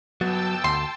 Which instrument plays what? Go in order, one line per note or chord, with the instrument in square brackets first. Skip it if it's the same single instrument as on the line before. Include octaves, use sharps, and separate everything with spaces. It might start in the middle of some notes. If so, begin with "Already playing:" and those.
[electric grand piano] G1 B3 A6 [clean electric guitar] F#3 [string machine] G5 A5 E6
[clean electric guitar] D2 [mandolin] C6